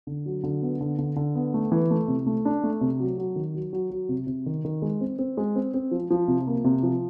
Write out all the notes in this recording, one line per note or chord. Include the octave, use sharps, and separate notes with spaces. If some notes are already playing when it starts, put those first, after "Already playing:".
D3
F#3
D3
B3
D3
D3
D3
B3
A3
E3
A3
C3
A3
D4
A3
C3
F#3
F#3
D#3
F#3
F#3
F#3
C3
C3
D#3
D#3
G#3
C4
C4
G#3
C4
C4
F3
F3
C3
A#3
C3
F3